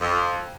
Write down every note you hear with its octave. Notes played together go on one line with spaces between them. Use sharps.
F2